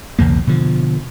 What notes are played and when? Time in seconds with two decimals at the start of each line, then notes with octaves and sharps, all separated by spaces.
0.19 B1 E2 C#3 A#3
0.47 B2 D3 F3